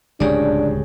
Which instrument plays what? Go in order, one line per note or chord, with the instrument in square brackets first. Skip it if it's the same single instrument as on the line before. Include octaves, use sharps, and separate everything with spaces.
[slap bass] D1 C#2 F#2 [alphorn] D4 [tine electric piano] G4 G#4 C#5 [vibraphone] D5